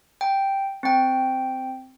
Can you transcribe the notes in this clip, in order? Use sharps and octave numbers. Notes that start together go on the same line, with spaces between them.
G5
C4 G5